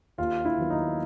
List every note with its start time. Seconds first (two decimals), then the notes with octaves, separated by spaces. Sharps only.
0.18 D#2 F4
0.45 E4
0.58 D#3 F#3 B3
0.70 D#4